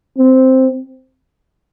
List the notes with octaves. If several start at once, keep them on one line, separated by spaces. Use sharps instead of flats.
C4